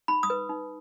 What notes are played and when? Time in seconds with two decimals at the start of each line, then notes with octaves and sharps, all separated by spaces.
0.08 D#4 B5
0.23 D#6
0.30 B4
0.49 D#4